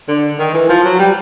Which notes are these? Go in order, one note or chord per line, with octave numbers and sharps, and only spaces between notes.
D3
D#3
E3
F3
F#3
G3